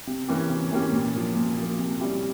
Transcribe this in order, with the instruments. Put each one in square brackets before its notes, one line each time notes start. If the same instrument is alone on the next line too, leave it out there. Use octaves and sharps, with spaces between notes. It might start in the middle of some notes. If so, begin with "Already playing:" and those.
[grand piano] C3
E3 A#3 C#4 G4
C3
E3 A#3 C#4 G4
A#2
F3 A#3
A#2
F3 A#3
C3
G3 C#4 E4 G4